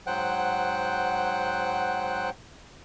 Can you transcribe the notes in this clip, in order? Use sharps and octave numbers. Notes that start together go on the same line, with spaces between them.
G#2 F#3 C5 F#5 G5 F#6